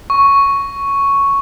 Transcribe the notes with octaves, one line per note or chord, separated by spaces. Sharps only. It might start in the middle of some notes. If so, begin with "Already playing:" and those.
C#6